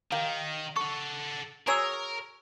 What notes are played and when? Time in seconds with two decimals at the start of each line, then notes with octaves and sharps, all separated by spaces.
0.12 D#3 G4 A#4 F5
0.76 A4 F#5 C#6
1.67 F#3 G#4 A#4 C#5 A#5 E6